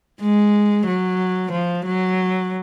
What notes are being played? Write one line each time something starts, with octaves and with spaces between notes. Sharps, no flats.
G#3
F#3
F3
F#3